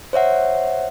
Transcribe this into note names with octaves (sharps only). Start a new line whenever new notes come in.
C5 C#5 E5 F#5